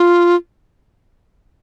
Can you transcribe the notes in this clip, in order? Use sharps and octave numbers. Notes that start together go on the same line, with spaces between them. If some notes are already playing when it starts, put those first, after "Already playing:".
Already playing: F4